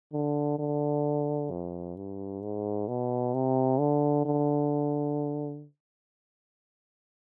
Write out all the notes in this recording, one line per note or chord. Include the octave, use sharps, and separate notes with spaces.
D3
D3
F2
G2
G#2
B2
C3
D3
D3